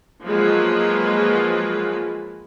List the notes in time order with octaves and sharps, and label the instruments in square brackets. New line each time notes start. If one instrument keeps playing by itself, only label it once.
[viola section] F3 F#3 G#3 A#3 F4 B4